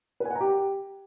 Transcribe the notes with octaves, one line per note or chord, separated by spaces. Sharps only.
B4
G#5
F#5
A#5
G4